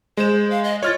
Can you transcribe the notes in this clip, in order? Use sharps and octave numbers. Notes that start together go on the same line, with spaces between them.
G#3 C5 E7
F5
D#5
F4 C#5 F6 A6